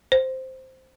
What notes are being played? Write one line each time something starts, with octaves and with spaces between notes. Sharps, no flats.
C5